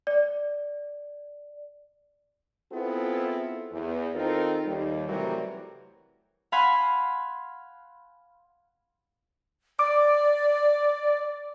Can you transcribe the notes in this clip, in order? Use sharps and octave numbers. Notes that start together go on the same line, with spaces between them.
D5
B3 C4 E4 F4 G#4 A4
E2
D#3 C4 D#4 F4 A4 A#4
D#2 G3
C3 E3 F#3 G3 A3 A#4
F5 F#5 G#5 B5 C6 F6
D5 D6